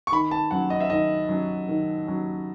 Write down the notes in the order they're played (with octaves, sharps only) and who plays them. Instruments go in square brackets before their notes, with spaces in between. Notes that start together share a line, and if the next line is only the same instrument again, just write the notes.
[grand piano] C#6
[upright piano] D#3 [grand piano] B5
[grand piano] A5
[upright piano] F#3 C#4 [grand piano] F#5
[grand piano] D#5
E5
[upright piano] D#3 [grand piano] D#5
[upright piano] F#3 C#4
D#3
F#3 C#4